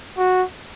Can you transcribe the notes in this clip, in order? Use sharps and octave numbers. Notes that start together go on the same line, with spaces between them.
F#4